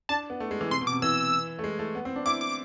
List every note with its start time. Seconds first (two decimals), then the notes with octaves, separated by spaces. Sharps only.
0.09 D4 A5
0.30 B3
0.40 A3
0.51 G#3
0.61 E3
0.71 C3 C6
0.81 B2
0.87 D6
0.92 C3
1.02 E3 E6
1.59 A3
1.64 G#3
1.79 A3
1.95 B3
2.05 C4
2.16 D4
2.26 E4 D6
2.41 D6